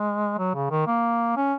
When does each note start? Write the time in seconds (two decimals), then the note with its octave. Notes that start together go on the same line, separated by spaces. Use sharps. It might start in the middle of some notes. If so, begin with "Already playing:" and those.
Already playing: G#3
0.39 F#3
0.55 C#3
0.71 D#3
0.87 A#3
1.37 C#4